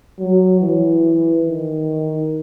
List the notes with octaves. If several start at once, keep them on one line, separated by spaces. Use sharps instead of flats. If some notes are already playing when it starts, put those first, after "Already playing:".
F#3
E3
D#3